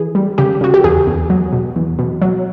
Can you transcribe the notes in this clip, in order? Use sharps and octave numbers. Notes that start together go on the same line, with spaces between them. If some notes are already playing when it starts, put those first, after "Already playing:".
Already playing: E3 G#4
G3
C#3 G4
C#3 F#4
G4
E2 G#4
E2
F#3
B2
E2
B2
F#3